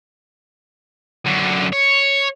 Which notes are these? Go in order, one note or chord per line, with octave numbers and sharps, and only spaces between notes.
F#2 D3
C#5